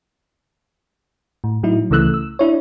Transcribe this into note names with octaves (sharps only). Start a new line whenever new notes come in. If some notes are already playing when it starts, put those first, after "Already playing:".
A2
A2 F#3 D#4 E4
C#2 C#3 E3 A3 E6 F#6
E6
D4 E4 C#5